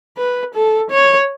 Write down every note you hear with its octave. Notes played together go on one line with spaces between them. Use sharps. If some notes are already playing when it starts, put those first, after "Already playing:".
B4
A4
C#5